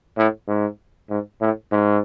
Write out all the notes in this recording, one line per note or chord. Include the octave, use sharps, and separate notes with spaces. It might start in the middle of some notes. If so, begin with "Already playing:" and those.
A2
G#2
G#2
A2
G#2